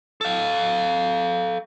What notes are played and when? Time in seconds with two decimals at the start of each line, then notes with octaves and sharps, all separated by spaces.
0.21 A4 F5